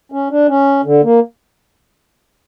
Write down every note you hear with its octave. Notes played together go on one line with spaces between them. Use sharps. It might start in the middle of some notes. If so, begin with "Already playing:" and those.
C#4
D4
C#4
D3
A#3